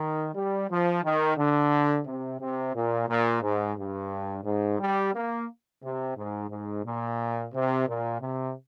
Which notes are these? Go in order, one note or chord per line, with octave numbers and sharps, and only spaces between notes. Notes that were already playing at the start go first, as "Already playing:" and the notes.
Already playing: D#3
G3
F3
D#3
D3
C3
C3
A#2
A#2
G#2
G2
G#2
G3
A#3
C3
G#2
G#2
A#2
C3
A#2
C3